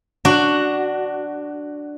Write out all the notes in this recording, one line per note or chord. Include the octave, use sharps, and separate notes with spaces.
D4 F#4